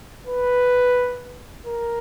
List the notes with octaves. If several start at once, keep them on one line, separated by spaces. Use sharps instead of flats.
B4
A#4